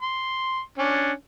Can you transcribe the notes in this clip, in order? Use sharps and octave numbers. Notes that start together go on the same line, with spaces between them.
C6
C#4 D4